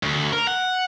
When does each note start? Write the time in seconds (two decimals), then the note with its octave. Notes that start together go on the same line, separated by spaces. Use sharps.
0.03 D2
0.33 A#4
0.47 F#5